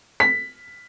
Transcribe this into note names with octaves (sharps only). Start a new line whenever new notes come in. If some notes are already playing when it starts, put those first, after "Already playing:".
B6